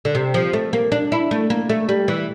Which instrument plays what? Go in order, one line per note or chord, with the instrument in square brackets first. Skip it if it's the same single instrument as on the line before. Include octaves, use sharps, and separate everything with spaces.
[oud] D3
C3
F3
A3
A#3
D4
E4
A3
A#3
A3
G3
E3